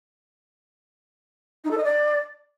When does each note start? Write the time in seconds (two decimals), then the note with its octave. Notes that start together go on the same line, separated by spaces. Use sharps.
1.64 D#4
1.71 A4
1.77 D#5
1.84 D5